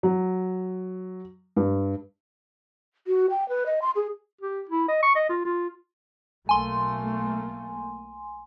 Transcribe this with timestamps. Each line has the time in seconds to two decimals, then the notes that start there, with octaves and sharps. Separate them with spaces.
0.03 F#3
1.56 G2
3.07 F#4
3.30 G5
3.49 B4
3.66 D#5
3.82 C6
3.95 G#4
4.41 G4
4.69 E4
4.88 D#5
5.03 C#6
5.15 D#5
5.29 F4
5.45 F4
6.49 B1 A3 A#3 G#5 C6